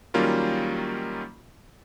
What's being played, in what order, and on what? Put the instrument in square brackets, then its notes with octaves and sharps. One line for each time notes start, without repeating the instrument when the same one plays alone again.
[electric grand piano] D#3 F#3 G3 A#3 C#4 F4